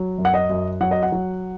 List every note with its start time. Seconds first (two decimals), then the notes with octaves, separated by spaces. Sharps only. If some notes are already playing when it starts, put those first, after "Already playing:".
Already playing: F#3
0.18 F#2
0.25 F#5
0.34 D#5
0.50 F#2
0.81 F#3 F#5
0.91 D#5
1.03 F#5
1.12 F#3